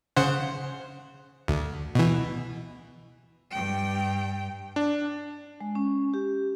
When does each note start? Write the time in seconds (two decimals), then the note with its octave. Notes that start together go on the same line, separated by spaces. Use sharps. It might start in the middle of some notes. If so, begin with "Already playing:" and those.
0.16 C#3 C5 F#5
1.48 D2
1.95 B2 E3
3.51 G2 G5
4.76 D4
5.61 G#3
5.75 C#4
6.14 G4